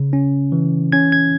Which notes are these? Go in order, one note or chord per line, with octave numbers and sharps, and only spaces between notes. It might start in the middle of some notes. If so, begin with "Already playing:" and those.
Already playing: C#3
C#4
E3
C#4 G#6
G#6